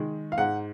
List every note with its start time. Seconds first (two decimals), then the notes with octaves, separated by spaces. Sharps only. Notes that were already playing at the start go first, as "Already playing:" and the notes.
Already playing: D#3 G#3
0.32 F5
0.38 G#2 F#5